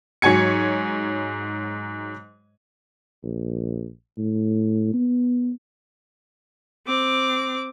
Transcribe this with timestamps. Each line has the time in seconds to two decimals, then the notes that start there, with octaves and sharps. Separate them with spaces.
0.22 G#2 F#3 C#5 G#5 G#6 C#7
3.23 A#1
4.18 A2
4.94 B3
6.87 C4 D6